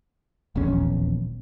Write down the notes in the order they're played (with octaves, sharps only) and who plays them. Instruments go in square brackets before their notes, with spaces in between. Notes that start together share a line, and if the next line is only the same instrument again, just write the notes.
[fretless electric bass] D#1 A#1 E2 C#4